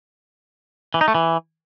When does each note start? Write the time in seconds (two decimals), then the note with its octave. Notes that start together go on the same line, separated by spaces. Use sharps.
0.94 E3
1.01 D#4
1.08 A3
1.15 E3